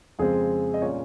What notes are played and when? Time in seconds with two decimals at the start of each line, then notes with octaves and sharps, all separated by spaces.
0.19 F2 C#3 G#3 C4 G#4
0.74 D#5
0.82 A#2 G3 C#4 C#5